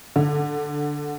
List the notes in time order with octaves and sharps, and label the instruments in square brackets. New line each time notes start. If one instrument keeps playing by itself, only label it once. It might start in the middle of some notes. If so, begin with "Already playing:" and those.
[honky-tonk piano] D3